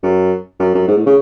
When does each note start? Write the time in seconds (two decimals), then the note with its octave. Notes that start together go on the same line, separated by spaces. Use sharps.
0.03 F#2
0.60 F#2
0.75 F#2
0.88 G#2
0.97 A2
1.06 C#3